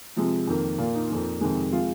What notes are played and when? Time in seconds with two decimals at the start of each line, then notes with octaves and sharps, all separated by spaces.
0.16 C3 F3 G#3
0.47 F2 D#3 A#3
0.78 A#2 A#3 F4
0.94 D#4
1.10 F2 F3 A#3
1.41 F2 C3 D#3 G#3
1.72 C3 F3 G#3 F4